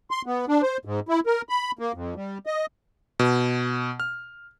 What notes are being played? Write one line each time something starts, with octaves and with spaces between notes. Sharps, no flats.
C6
B3
D4
C5
G#2
E4
A#4
B5
A#3
F2
G3
D#5
B2
F6